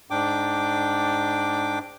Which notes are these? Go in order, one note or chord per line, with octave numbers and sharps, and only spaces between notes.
G#2 D4 G5 D6